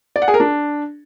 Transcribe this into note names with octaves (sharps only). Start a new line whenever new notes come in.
D5
F#5
G#4
A#4
D4